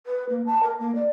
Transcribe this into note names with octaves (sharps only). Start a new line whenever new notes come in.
B4
A#3
A5
A#4
A#3
D5